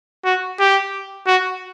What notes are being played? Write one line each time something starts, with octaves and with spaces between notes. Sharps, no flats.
F#4
G4
F#4